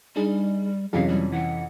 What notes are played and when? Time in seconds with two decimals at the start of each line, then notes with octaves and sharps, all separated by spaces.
0.16 G3 D4 D#4 G#4
0.93 F2 C3 E3 F#3 C#4 G#4 F5
1.08 G3
1.32 E3 F#5